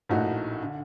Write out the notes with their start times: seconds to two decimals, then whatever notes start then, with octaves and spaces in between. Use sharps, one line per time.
0.09 A#1 A2 A3 D#4 F#4
0.63 D3